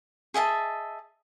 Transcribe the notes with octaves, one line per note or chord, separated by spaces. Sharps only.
G#4 D#5 E5 A5